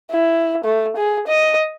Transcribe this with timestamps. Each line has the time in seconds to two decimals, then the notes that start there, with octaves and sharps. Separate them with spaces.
0.11 E4
0.64 A3
0.97 G#4
1.27 D#5